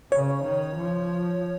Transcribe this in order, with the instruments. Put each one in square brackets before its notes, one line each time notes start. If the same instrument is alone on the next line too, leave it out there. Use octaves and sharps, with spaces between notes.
[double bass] C#3 [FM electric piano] C#5
[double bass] D#3
F3